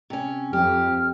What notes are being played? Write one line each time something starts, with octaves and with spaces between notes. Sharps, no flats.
C3 C#4
F2 G4 F6